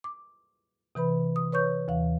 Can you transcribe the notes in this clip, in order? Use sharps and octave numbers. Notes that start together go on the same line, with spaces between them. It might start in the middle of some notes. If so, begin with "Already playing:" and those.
D6
C3 E3 B4 B5
D#6
B4 C#5 C#6 G6
D#2 E3 F5